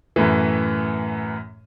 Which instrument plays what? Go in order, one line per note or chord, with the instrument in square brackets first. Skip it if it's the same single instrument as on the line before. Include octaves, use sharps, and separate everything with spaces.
[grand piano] F#2 A2 E3